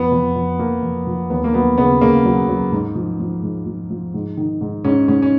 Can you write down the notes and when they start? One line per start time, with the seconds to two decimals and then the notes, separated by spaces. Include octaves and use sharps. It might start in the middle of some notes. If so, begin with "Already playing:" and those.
Already playing: F2 B3
0.12 F2
0.36 F2
0.59 F3 A#3
0.83 F2
1.07 F3
1.30 D#2 B3
1.44 A#3
1.54 F#3 B3
1.78 C#3 B3
2.01 C#3 A#3
2.25 F#3
2.48 F#3
2.72 G#2
2.96 F3
3.20 F3
3.43 G#2
3.66 F3
3.91 F3
4.14 G#2
4.37 D#3
4.61 G#2
4.84 G#2 C#4
5.08 G#2 C#4
5.22 C#4